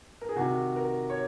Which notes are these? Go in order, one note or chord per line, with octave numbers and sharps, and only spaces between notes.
A#4
G#4
C3 D#3 F#4
A#4
C#5